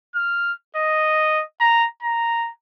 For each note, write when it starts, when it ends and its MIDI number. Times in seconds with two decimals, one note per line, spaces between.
0.15 0.53 89
0.76 1.43 75
1.61 1.87 82
2.03 2.50 82